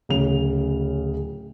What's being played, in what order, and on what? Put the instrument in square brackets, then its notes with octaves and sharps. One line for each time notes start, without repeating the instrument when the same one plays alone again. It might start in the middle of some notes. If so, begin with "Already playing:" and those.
[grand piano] D1 C#3 F7